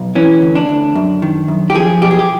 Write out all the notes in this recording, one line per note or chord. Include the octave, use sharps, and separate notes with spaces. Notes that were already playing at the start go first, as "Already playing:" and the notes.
Already playing: B1
E3 C#4
D2
D4
D2
F#2
D#3
F#2
G4
F3 G#4
B1 G4
G#4
G4